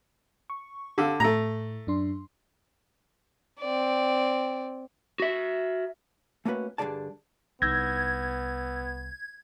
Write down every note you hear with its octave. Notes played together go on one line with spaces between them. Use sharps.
C#6
D3 G4 F5 E6
A2 A3 A#5
F#2 D4 C6
C4 D5
F#4 E5
A3 A#3 C#4 F#4 B4
G2 D3 G#3 G#4 D5 A5
C2 B3 D#4 E6 G6 G#6 A#6